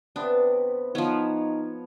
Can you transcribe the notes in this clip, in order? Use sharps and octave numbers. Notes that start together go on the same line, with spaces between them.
C3 B3 D4
F3 B3 D#4 C#5